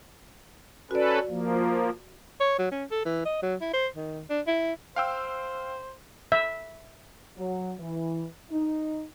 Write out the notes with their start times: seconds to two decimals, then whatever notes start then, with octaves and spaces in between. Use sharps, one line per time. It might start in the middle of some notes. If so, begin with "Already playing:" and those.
0.91 C#4 F#4 A4 B4 D5
1.28 F3 A#3
2.40 C#5
2.59 F#3
2.71 C#4
2.91 A4
3.05 E3
3.25 D#5
3.42 F#3
3.61 E4
3.73 C5
3.96 D#3
4.30 D4
4.47 E4
4.96 C5 F5 G5 E6
6.32 E5
7.36 F#3
7.79 E3
8.50 D#4